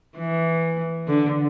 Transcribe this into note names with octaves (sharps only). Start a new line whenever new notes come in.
E3
D3